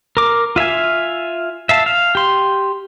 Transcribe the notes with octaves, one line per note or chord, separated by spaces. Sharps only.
A#4 D6
F4 E5 F5 G#5
E5 F5 A5
F5
G4 C6